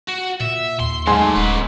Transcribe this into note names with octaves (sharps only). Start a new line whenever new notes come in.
F#4
A#2 E5
D#2 C6
G#2 F#3 A3 G#5 C6
D#1 C#4 B4